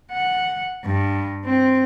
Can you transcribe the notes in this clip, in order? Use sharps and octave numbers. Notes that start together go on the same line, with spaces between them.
F#5
G2
C4